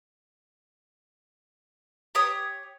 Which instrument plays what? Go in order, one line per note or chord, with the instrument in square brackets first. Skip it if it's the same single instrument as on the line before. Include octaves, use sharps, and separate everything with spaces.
[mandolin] G4 C#5 D#6